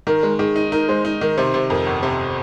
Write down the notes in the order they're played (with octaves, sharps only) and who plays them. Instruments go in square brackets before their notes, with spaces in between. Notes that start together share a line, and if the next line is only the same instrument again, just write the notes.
[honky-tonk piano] D#3 [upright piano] A#4
[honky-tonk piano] G#3
[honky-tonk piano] D#3 [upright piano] G#4
[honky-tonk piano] D#4
[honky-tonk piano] D#4 [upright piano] A#4
[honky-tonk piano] G#3 [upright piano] C5
[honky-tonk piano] D#4
[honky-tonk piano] D#3 [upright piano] A#4
[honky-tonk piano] C3 [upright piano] C5
[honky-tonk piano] C3
[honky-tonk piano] F2 [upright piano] A#4
[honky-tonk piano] G1
[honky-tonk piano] C3 [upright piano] C5